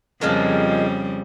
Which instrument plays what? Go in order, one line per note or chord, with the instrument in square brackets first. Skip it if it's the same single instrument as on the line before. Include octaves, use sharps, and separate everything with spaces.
[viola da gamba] F2 C#3 G3 [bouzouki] F3 G#3 A#3